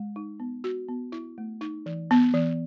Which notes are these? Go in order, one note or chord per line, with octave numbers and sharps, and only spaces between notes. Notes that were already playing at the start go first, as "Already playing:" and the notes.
Already playing: G#3
D#4
B3
F#4
B3
E4
A3
D#4
E3
B3
E3